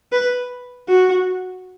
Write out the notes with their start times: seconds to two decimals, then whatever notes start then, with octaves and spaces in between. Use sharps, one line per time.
0.12 B4
0.89 F#4